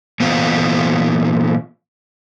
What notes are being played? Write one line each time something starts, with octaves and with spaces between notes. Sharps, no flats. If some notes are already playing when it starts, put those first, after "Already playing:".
A#2 E3 B3 F4 C5 F5